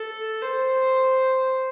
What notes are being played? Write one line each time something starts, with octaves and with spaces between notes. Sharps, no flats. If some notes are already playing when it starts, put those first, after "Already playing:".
Already playing: A4
C5